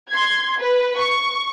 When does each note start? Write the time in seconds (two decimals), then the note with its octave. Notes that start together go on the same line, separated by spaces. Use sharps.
0.11 C6 G#6
0.59 B4
0.97 C#6